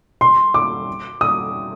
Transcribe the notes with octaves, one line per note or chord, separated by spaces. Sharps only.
C6
D6
D#6